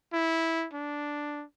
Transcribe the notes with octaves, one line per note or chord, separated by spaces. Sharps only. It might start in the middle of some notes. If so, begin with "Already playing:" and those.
E4
D4